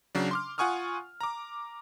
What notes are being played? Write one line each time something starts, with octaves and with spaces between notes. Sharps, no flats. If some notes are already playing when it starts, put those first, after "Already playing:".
C#3 F#3 D4
C6 D6 F6
F4 F#5 G#5 C#6 D#6 F6
A#5 D6